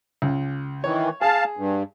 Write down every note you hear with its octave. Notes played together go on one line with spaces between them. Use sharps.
C#2
D#3 E3 C#5
G#4 F5 A5
G2